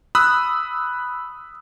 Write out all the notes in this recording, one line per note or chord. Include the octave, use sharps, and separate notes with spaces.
B5 D#6 E6 F#6